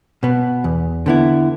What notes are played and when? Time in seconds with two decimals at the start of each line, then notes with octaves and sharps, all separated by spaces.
0.23 B2 B3
0.64 E2
1.06 D3 B3 E4